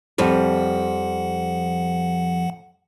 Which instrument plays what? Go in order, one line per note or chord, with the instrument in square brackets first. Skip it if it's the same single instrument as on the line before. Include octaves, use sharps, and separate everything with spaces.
[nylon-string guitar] F2 G3 [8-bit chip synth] F3 F#5